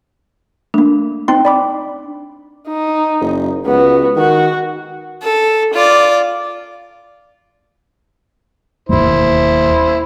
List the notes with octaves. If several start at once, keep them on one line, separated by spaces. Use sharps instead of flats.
A3 A#3 D4
C4 D#4 G5 C6
D5 B5 D6
D#4
F#1
C#2 B3 F#4
D#3 F#4
A4
F4 D5
E1 D#2 E4 C5